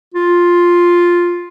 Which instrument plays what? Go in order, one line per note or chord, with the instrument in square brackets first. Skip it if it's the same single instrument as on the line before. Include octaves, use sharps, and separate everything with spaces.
[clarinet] F4